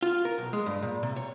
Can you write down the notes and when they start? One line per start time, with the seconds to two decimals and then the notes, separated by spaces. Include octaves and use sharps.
0.03 F4
0.25 A#4
0.38 B1
0.53 G#3
0.66 G2
0.82 A#2
1.03 C3
1.16 C#5